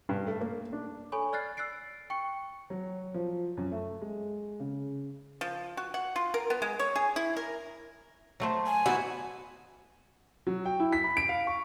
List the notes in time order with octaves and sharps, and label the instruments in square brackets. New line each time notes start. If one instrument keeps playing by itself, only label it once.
[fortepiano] G2
A3
A#3
D4
[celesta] A4 C#5 G#5 B5 C#6
D5 F6 F#6 A6 C7
E6 F#6 A6 C7 D7
G5 C#6 C#7
[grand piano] F#3
F3
F#2
A3
G#3
C#3
[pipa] F3
F#4
F#5
F4
A#4
B3
G#3
C#5
G#4
E4
A#4
[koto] F#3 A3 C5
[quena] G#5
[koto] B3 D#4 E4 [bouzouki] F#4
[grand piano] F#3
G5
E4
B6
B5
D7
F5
C#6